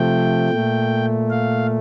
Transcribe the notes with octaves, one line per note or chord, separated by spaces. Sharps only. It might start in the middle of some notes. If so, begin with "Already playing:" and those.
Already playing: C3 F3 A3 G5
A#2 A3
F5